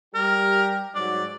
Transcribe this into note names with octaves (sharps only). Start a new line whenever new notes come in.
G3 G4 A#4
G#2 F#3 D5